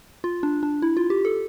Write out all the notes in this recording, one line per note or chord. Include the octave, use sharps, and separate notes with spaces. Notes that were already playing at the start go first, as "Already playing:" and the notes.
F4
D4
D4
E4
F4
G4
A4